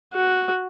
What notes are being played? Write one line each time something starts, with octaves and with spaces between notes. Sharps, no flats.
F#4